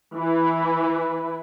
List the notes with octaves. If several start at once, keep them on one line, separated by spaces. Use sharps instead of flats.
E3 E4 B4